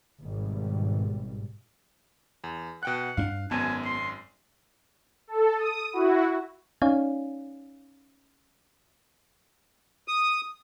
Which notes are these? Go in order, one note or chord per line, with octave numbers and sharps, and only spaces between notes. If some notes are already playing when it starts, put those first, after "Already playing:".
G#1 B2 G3
E2
B2 F#5 G5 F#6
G2 C#4 D4 F5
G#1 F#2 B3 G#5 A5
C6
A4
D#6
E4 F#4
C#4 D#4 C#5 D5 F5 G#5
D#6